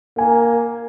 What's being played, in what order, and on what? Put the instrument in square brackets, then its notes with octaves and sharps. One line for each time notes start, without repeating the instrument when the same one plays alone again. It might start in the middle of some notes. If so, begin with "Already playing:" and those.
[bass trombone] A#3 [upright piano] A#4 G#5